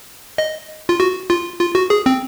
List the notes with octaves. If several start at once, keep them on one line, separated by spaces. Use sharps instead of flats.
D#5
F4
F#4
F4
F4
F#4
G#4
C4